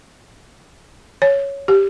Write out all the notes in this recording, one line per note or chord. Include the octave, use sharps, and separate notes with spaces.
C#5
G4